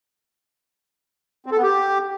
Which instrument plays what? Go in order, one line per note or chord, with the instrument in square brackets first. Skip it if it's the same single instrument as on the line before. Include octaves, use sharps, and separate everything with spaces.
[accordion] C4
A4
B3
G4